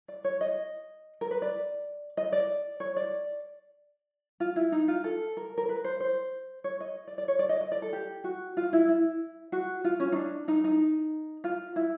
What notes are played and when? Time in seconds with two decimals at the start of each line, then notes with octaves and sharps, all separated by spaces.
0.08 D5
0.24 C#5
0.41 D#5
1.21 A#4
1.31 B4
1.42 D5
2.17 D#5
2.32 D5
2.80 C#5
2.96 D5
4.40 F4
4.56 E4
4.72 D#4
4.88 F4
5.04 A4
5.37 A#4
5.58 A#4
5.69 B4
5.84 C5
6.00 C5
6.64 C#5
6.80 D#5
7.07 D5
7.18 D5
7.28 C#5
7.39 D5
7.49 D#5
7.61 D#5
7.72 D5
7.82 A4
7.93 G4
8.24 F#4
8.57 F4
8.73 E4
8.88 E4
9.52 F#4
9.84 F4
10.00 C#4
10.12 D#4
10.15 D4
10.48 D#4
10.64 D#4
11.44 F4
11.76 E4